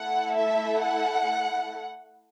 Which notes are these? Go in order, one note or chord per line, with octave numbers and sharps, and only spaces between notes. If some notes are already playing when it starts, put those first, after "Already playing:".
Already playing: A3 E4 A4 F#5
E5
F#5